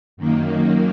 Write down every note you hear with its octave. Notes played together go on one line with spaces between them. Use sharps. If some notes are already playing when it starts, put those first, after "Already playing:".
F#2 D#3 A#3